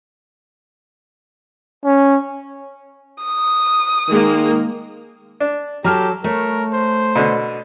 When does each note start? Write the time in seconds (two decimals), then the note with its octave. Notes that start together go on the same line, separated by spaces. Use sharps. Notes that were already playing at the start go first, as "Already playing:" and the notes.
1.85 C#4
3.24 D#6
4.08 D#3 G#3 A#3
5.40 D4
5.84 F#3 G4 A4 A#5 F6
6.24 A3 A#4 C#5
6.73 C5
7.16 B2 D3